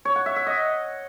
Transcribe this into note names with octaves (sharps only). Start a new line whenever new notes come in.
C#5
F#5
E5
E5
D#5